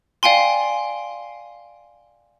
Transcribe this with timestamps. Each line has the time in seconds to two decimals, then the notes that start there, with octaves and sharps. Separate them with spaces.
0.23 D5 F5 G5 G#5 C6